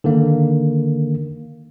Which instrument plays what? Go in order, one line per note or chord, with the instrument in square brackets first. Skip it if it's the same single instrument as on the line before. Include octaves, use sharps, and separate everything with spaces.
[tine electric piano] D3 D#3 A#3